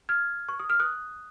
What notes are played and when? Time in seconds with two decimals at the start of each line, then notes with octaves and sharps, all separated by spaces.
0.09 F6 G#6
0.49 C#6
0.60 D#6
0.70 F6
0.80 D#6 F#6